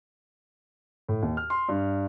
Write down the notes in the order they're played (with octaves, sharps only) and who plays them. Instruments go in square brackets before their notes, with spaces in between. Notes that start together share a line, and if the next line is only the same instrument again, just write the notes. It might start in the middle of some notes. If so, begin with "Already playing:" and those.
[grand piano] A2
D#2
F6
C6
G2